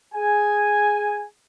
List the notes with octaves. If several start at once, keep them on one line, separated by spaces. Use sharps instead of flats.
G#4 G#5